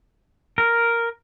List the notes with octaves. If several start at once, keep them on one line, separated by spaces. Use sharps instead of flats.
A#4